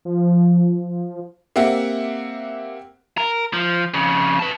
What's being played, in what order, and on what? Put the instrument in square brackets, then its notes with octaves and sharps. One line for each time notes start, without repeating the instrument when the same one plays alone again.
[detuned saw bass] F3
[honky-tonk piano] A#3 C4 G4 E5 F#5
[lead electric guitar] A#4
F3
F2 C#3
B4 A5